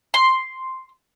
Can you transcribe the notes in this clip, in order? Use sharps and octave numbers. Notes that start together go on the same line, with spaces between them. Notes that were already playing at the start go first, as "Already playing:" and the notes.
C6